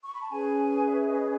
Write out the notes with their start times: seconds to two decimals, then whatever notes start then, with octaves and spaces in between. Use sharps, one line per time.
0.03 C#6
0.13 B5
0.21 A5
0.30 C#4 G#4 B4 G#5
0.88 E5
1.07 D#5